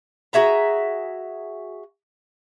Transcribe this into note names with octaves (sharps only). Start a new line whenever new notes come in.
F#4 G#4 E5 A#5